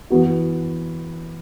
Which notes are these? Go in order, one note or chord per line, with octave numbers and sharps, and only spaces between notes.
E3 B3 F#4